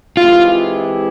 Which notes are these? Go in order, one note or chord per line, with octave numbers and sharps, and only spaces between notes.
E3 G#3 C4 E4 F4 G4